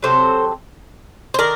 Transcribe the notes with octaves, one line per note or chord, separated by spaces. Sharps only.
C3 F#3 C4 A4 C5
C5
D#3 A#4 D5